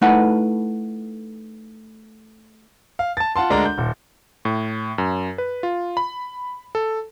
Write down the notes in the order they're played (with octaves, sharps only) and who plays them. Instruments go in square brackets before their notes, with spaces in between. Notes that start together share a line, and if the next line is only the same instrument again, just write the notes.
[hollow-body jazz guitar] A3 D#4 E4 A4 B4 F#5
[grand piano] F5
A5 A6
F4 F#5 A5 C6
D2 G#3 D4 A#4 D5 A#5
G6
D#1
[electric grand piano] A2
F#2
B4
F4
B5
A4